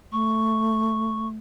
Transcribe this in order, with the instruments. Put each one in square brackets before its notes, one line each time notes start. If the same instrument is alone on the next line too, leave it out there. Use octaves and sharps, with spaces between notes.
[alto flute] A3 [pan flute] C#6